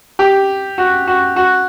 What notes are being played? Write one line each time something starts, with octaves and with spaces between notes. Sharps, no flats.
G4
F#4
F#4
F#4